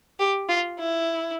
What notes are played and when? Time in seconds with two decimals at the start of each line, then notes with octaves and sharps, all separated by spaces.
0.19 G4
0.49 F4
0.79 E4